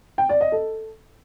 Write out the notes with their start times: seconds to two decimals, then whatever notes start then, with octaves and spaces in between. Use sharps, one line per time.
0.18 G5
0.29 D5
0.41 D#5
0.52 A4